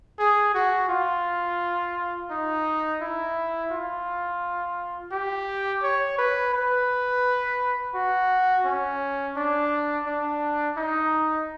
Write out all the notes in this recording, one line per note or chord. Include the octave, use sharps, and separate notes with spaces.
G#4
F#4
F4
D#4
E4
F4
G4
C#5
B4
B4
F#4
C#4
D4
D4
D#4